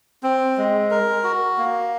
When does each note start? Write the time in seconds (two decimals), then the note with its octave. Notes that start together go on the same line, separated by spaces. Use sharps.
0.23 C4
0.58 G#3
0.91 A#4
1.24 F#4
1.58 A#3